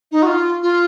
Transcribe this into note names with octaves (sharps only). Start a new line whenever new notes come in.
D#4
F#4
F4
F4